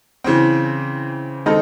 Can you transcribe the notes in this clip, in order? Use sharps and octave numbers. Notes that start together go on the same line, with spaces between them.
C#3 E3 C4
D#3 G#3 C4 D#4 A4